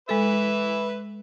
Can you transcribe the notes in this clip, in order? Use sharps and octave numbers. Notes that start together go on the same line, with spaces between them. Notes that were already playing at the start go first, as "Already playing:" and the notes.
G#3 A4 B4 E5